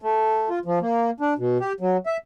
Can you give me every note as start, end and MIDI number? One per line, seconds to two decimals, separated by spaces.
0.02 0.49 57
0.50 0.59 65
0.65 0.79 53
0.81 1.10 58
1.20 1.34 62
1.38 1.58 47
1.60 1.73 67
1.80 1.97 54
2.06 2.17 76